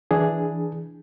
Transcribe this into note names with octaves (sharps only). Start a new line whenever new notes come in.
E3 D4 G#4